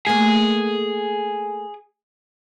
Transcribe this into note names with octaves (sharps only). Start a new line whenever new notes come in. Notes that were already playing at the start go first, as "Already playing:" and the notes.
A3 A#3 G#4